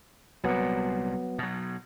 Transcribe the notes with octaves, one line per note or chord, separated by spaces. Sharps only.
C2 A#2 F#3 B3
B2 F#3